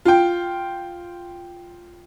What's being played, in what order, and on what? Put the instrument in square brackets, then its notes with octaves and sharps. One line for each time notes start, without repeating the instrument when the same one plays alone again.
[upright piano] F4 G5